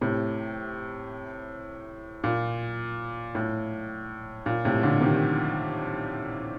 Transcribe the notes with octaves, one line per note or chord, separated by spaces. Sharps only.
A2 C3
A#2
A2
A#2
A2 C3
A#2 D3
C3 D#3